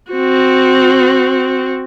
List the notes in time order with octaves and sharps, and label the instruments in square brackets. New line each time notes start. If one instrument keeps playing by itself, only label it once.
[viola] C4 F#4